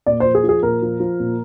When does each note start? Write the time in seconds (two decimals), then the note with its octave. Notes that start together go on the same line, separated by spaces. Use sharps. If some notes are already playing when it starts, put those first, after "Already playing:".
0.06 A#2 D5
0.20 F3 C5
0.35 G#4
0.44 F3
0.49 G#4
0.63 A#2 A#4
0.82 F3
1.00 F3
1.20 A#2